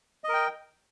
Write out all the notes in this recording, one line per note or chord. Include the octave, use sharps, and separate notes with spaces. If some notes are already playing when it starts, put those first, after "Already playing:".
A#4 D#5 G5